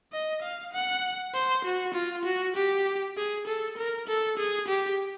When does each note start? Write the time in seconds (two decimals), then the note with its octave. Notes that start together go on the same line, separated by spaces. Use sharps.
0.12 D#5
0.42 F5
0.73 F#5
1.34 C5
1.65 F#4
1.94 F4
2.25 F#4
2.56 G4
3.17 G#4
3.47 A4
3.78 A#4
4.08 A4
4.38 G#4
4.68 G4